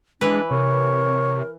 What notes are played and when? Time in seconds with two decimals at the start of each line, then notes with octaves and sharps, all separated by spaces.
0.21 E3 G#3 D4 B4
0.51 C3 A#4 C#5